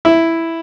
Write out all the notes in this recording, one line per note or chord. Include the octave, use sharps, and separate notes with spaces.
E4